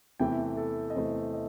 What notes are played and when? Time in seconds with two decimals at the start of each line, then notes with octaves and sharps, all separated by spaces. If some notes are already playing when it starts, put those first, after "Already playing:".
0.20 E2 C3 E3 A3 G5
0.57 A4
0.90 D#5
0.95 E2 C3 E3 A3 C5
1.33 D#5